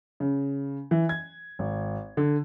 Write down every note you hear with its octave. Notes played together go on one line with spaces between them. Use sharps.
C#3
E3
G#6
G#1
D3